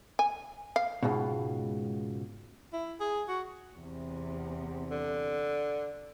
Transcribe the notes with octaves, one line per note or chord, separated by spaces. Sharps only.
G#5
F5
C#2 G#2 B2
E4
G#4
F#4
E2 C3
D3